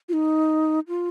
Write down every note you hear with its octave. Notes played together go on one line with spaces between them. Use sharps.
F4
D#4
F4